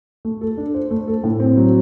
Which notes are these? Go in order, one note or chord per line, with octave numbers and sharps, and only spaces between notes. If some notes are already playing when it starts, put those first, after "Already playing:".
A3
A4
D4
C5
A3
A4
A2
C4
F#3